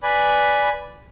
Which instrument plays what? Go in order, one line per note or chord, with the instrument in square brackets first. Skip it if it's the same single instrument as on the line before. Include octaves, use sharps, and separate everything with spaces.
[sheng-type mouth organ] B4 D5 G#5 B5